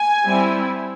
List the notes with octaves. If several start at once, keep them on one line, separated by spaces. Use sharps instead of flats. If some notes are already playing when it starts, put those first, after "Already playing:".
Already playing: G#5
G3 C4 E4